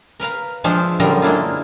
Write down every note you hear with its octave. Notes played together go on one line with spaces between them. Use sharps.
A#4 B4 F5 A#5
F3 G#3 D4 F4 C5 E5
F#2 D3 G3 F4 A#4 D#5
G#3 A#3 D4 E4 F4